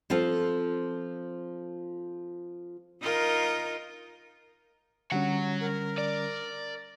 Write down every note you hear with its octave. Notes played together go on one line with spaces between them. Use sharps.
F3 C4 F4 A4
D#4 F4 A#4
D3 G3 C#4 C#5 F#5
A#4
D5